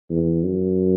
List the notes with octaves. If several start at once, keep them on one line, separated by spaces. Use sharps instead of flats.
E2
F#2